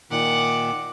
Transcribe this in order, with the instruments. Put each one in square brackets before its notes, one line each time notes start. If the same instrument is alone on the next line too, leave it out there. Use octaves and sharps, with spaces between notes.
[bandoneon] A#2 D#3 [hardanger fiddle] F#5 D6